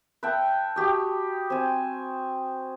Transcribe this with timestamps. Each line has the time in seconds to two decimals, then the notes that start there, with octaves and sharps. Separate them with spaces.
0.23 B4 E5 G5 A5
0.76 F#4 G4 D#5
1.50 C4 G#5